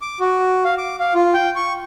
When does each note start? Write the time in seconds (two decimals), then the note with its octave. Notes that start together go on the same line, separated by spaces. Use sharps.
0.02 D6
0.20 F#4
0.64 F5
0.78 D6
1.00 F5
1.15 F4
1.34 G5
1.56 C#6